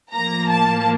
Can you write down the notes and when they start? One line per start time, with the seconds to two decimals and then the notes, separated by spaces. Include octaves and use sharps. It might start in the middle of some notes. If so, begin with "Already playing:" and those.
0.12 A2 F3 A#3 A#5
0.51 A5